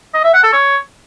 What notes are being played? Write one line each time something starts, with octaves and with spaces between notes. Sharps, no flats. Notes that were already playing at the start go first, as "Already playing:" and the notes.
D#5
E5
F#5
A4
C#5